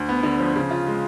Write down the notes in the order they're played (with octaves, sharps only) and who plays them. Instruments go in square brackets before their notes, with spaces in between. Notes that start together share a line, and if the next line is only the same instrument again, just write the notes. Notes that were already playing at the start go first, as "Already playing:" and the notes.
Already playing: [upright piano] D2
B3
D3
F3
C#3
F4
G#3